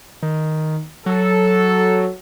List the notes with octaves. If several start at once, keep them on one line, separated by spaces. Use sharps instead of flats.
D#3
F#3 A4